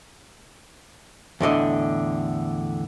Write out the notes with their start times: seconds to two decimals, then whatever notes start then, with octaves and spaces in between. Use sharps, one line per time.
1.41 E2 A2 D3 D#5